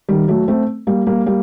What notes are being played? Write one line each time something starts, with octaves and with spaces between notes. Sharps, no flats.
D#3 G3
F#3 A3
A3 C4
G3 A#3
G3 A#3
G3 A#3